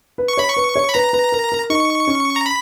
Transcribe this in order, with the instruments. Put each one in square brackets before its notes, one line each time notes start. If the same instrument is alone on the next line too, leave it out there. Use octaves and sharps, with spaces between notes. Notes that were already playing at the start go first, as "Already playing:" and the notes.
[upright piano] B4
[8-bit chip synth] C#6
[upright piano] C#5 [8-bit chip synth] B5
[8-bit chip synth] C#6
[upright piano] B4
C#5
[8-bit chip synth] B5
[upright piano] B4 [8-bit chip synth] A#5
[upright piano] B4
A#4
A#4
[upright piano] D#4 [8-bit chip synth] C#6
[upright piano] C#4
[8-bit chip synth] A#5
B5